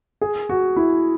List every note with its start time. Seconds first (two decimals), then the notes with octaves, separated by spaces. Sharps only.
0.21 G#4
0.49 F#4
0.76 E4